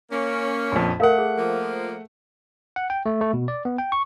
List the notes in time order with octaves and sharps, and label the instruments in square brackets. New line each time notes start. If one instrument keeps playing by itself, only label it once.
[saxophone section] A#3 C#4
[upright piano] A#1 F2
[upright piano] A3 F#5 [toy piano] A#4 F5
[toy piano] G#4
[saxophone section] F3 A#3
[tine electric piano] F#5
G5
A3
A3
B2
D5
B3
G5
C#6